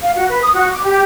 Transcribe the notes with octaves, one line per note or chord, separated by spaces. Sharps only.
F5
F#4
B4
D#6
F#4
D6
G4